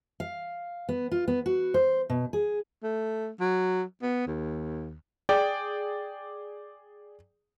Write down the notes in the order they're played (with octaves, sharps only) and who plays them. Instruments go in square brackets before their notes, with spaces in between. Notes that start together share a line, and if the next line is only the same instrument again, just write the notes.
[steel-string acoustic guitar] F5
B3
F4
B3
F#4
C5
B2
G#4
[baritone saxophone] A3
F#3
B3
D#2
[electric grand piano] G#4 D5 G5